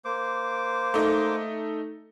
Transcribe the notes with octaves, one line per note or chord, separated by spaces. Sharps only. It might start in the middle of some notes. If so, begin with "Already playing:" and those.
A#3 C5 D6
A3 D#4